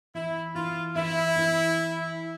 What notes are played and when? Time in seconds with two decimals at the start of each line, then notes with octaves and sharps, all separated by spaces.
0.15 E3 E4
0.55 E3 F4
0.96 E3 E4
1.36 E3